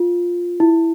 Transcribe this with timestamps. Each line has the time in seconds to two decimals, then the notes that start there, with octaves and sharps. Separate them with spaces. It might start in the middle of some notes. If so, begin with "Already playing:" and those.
Already playing: F4
0.60 E4